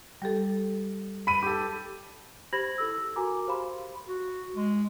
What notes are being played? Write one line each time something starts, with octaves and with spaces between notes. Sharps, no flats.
G3 G4 A4
B5 D#7
G4 A4
G4 C5 B5 G#6 A#6 F#7
E4 A4 E6
F#4 A#4 G#5 A#5 D6
G4 C5 F5 B5 C6
F#4
G#3